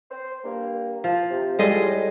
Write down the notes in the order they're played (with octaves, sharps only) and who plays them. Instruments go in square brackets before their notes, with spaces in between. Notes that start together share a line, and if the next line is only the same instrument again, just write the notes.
[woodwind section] C5
G2 A#3
[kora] F3
[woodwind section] C3
[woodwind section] A2 [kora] G3 G#3 D#5